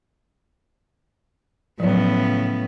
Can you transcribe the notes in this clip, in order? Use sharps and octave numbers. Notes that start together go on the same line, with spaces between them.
A2 C#3 F3 F#3 B3